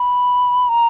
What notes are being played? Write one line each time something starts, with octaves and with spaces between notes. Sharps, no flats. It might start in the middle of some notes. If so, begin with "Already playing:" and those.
Already playing: B5
A#5